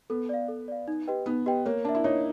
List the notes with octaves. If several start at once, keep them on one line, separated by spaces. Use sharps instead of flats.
B3 A4
D5 F5
A4
D5 F5
D#4
G4 B4 D#5 G5
B3 D#4
G4 B4 D#5 G5
A#3 C#5
D4 E5 A5
E4
D#4 C#5